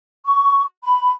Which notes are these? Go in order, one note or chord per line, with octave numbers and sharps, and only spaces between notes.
C#6
B5